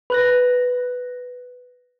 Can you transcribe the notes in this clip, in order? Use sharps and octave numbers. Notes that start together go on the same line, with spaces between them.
B4 F#6 A#6